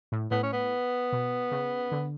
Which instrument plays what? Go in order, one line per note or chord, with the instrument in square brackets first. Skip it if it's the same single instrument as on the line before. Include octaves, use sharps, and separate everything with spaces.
[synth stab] A2
[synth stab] A2 [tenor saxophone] B3
[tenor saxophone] C#4
B3
[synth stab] B2
C#3
D3